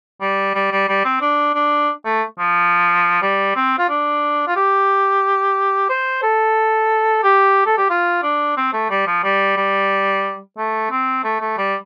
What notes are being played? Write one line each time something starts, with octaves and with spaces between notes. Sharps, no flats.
G3
G3
G3
G3
C4
D4
D4
A3
F3
G3
C4
F4
D4
F4
G4
C5
A4
G4
A4
G4
F4
D4
C4
A3
G3
F3
G3
G3
A3
C4
A3
A3
G3